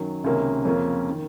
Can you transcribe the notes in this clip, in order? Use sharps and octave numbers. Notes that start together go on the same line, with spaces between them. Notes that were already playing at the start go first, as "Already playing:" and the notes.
Already playing: F#2 D#3 F#3
C#2 C3 D#3 A#3 C#4
F2 C#3 F3 A#3 C#4
D#3